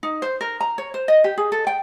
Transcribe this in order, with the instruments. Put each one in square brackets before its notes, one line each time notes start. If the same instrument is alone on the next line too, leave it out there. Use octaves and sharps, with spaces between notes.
[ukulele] D#4
C5
A#4
A#5
C#5
C5
D#5
G4
G#4
A4
G5